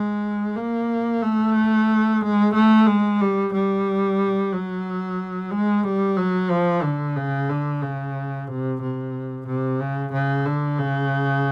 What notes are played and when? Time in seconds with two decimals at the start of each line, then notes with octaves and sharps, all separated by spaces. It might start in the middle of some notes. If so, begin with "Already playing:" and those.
Already playing: G#3
0.56 A#3
1.22 A3
2.21 G#3
2.54 A3
2.87 G#3
3.20 G3
3.53 G3
4.52 F#3
5.51 G#3
5.84 G3
6.17 F#3
6.50 F3
6.83 D3
7.16 C#3
7.49 D3
7.82 C#3
8.48 C3
8.81 C3
9.47 C3
9.80 C#3
10.13 C#3
10.46 D3
10.79 C#3